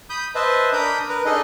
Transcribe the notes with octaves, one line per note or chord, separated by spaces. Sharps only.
B5 D#6 G6
B4 C5 D#5 E5 A5
D4 A#4 B5 D#6 G6
A#4 B4
D4 D#4 G#4 A4 D#5